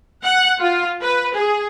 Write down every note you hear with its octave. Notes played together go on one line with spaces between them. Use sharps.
F#5
F4
B4
G#4